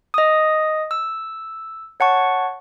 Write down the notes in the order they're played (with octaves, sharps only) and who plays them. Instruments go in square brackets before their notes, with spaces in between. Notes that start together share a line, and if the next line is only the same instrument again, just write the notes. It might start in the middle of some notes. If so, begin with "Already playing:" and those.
[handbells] D#5 D#6
E6
C#5 F#5 A5 C#6